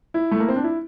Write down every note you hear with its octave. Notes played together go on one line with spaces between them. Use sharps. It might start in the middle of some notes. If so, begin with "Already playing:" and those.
E4
A3
A#3
C4
D4
E4